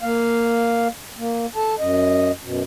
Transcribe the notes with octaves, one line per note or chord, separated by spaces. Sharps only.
A#3 F5
A#3
A4 A5
F#2 D#5
F#2 B2